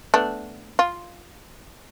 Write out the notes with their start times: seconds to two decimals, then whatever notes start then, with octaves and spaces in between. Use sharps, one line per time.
0.14 A3 B3 D4
0.79 F4